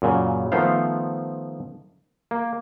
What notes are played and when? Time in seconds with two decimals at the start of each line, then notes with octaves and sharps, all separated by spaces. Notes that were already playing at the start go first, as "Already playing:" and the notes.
0.02 F#2 A#2 C#3
0.52 D#3 F3 A3 B3 C5 F5
2.31 A#3